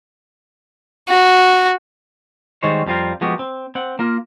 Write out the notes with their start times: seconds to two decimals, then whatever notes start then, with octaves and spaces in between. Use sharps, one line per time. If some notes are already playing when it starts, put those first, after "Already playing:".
1.09 F#4
2.63 D#3 G3 G#3 F#4 C5 C#5
2.87 F2 G3 C4 F4 A#4
3.21 F3 G#3 B3 F#4 G4
3.39 C4
3.75 C4 F#5
3.99 A#3 F4 A#4